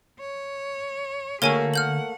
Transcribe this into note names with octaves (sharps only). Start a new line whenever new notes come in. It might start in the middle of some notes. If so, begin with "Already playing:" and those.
C#5
D3 A3 A#3 F#4 G#4 A#4 C#5 G#5
F#5 F6 G6 F#7